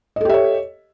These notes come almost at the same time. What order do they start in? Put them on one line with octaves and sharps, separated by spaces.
D#5 A4 G4 E5 C#5